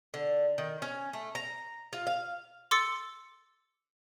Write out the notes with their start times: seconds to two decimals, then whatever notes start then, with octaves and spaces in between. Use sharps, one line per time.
0.14 D3
0.58 D#3
0.82 C#4
1.13 A3
1.35 A#5
1.93 F4
2.07 F5
2.71 C6 D6 E6 A6 C#7